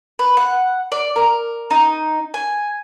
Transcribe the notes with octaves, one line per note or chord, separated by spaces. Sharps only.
B4
F#5
D5
A#4
D#4
G#5